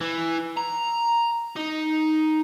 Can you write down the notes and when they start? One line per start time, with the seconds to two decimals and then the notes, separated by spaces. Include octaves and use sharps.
0.01 E3
0.57 A#5
1.56 D#4